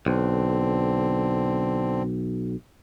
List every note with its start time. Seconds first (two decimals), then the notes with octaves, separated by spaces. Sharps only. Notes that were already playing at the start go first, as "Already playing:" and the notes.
0.06 B1 D3 C4